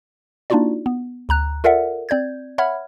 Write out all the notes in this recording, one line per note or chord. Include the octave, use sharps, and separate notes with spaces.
A#3 D4 D#4 F4 F#4 D5
B3
D2 A#5 F#6
F4 A4 A#4 D5 E5 F#5
C4 D5 G6 G#6
C#5 E5 F#5 B5 F6 G#6